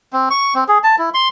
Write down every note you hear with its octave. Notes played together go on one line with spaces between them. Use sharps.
C4
C#6
C4
G#4
A5
E4
C6